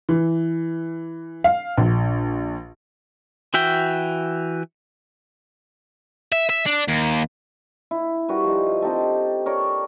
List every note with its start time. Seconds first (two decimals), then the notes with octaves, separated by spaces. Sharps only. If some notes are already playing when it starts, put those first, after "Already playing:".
0.09 E3
1.44 F5
1.77 A#1
3.54 E3 F#4 E5 G5
6.33 E5
6.50 E5
6.66 D4
6.89 D#2
7.91 E4
8.29 G3 F#4 A#4 B4
8.44 F3 D#4
8.82 C4 D#4 G4 A4
9.46 A#4 C#5 D5